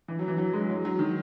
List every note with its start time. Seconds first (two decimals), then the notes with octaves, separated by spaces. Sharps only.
0.08 E3
0.19 F#3
0.28 E3
0.38 F#3
0.53 G#3
0.70 F#3
0.85 F#3
0.99 D#3